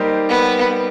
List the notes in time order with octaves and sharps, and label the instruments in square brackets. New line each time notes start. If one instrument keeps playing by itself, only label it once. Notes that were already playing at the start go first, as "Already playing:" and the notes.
Already playing: [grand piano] G3 A#3 D#4 G4 C5
[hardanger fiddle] B3